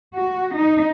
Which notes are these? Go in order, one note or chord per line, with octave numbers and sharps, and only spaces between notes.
F#4
D#4